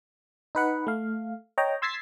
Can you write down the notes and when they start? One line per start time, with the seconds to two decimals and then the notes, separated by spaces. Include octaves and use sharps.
0.55 D#4 B4 F#5
0.87 A3 F5
1.58 C#5 D#5 G5 A#5
1.82 C6 E6 G#6 A6 B6 C7